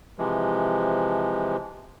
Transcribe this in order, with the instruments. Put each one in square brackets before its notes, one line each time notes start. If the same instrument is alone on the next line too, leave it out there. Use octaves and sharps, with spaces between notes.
[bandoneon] C3 E3 F3 G#3